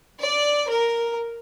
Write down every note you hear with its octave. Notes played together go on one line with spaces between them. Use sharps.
D5
A#4